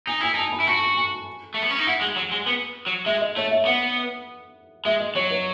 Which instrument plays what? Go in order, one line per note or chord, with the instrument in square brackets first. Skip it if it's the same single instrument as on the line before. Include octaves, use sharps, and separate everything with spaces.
[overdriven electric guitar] D#4 [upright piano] G#5
[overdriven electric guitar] E4 [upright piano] G#5
[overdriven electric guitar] D#4 [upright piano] A5
[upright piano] B5
[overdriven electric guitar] E4
[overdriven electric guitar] F#4 [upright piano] A5
[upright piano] G#5
[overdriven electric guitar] A3
B3
C#4
D#4
[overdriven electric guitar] E4 [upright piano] F#5
[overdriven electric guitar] G#3
F#3
G#3
B3
F#3
[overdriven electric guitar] G#3 [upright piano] E5
[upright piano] D#5
[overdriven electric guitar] A3 [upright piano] C#5
[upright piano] E5
[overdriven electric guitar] B3 [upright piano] F#5
[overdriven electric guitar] G#3 [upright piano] E5
[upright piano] D#5
[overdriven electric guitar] F#3 [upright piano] C#5
[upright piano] B4